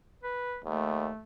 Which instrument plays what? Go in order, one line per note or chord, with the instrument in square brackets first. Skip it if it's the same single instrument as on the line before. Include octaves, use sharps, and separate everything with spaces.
[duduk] B4
[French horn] D#2 [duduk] A3